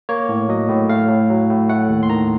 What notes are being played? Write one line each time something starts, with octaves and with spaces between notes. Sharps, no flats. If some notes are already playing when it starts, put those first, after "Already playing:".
A#3 C#5
A2
F#3 D#5
A2
A3 F5
A2
F#3
A2
A3 F#5
D#2
C6
D#3 A#5